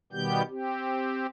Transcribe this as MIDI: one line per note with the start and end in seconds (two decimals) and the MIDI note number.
0.12 0.42 47
0.12 0.42 51
0.12 0.42 55
0.12 0.42 59
0.12 0.42 67
0.12 0.42 91
0.49 1.26 60
0.49 1.26 67